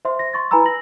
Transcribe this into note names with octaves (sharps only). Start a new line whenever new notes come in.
C5 E5 C6
A#6
C6 C#6 A6
E4 B4 G#5 A#5 B5 E6
A#6 F#7